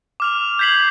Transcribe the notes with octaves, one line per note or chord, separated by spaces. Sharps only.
D6 F6 F7
G6 G#6 B6 C7 F#7